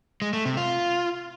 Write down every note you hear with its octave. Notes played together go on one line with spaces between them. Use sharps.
G#3
A3
C3
F4